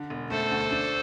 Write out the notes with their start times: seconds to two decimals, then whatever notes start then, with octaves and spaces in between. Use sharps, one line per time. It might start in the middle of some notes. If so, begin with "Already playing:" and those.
Already playing: D3
0.10 E1
0.30 A3 A4 C5
0.51 D2
0.71 D4